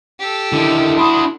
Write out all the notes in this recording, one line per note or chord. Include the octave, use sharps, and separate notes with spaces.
G4 A4
D3 D#3 E4
D4 F#4 B5 C6 D#6